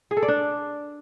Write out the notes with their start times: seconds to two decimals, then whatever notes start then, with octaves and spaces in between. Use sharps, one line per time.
0.11 G#4
0.17 A4
0.23 D5
0.28 D4